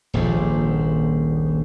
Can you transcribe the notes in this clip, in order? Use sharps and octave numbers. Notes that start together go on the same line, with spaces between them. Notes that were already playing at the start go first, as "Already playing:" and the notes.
D#1 A#1 G#2 F3